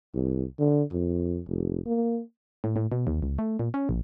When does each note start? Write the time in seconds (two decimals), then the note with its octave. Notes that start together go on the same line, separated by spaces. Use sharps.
0.14 C2
0.59 D3
0.92 F2
1.48 F1
1.86 A#3
2.64 A2
2.76 A2
2.92 B2
3.07 D#2
3.22 C#2
3.39 A3
3.59 A#2
3.74 C#4
3.89 A#1